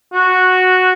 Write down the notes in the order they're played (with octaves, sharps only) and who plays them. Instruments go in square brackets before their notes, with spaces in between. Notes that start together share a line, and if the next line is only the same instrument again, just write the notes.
[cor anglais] F#4